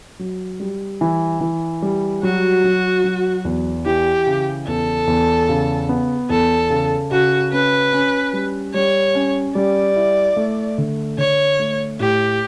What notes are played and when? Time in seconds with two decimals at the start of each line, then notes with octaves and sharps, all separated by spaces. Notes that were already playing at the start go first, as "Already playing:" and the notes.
0.19 F#3
0.60 G3
1.01 E3
1.41 E3
1.82 G3
2.23 F#3 F#4
2.64 F#3
3.04 F#3
3.45 E2
3.86 E3 G4
4.26 C#3
4.67 E2 A4
5.07 E2
5.49 C#3
5.89 B3
6.30 E2 A4
6.70 C#3
7.11 C#3 F#4
7.52 C#4 B4
7.93 C#4
8.33 G3
8.74 G3 C#5
9.15 C#4
9.55 G3 D5
9.96 E4
10.37 A3
10.78 D3
11.18 D3 C#5
11.59 A3
12.00 A2 G4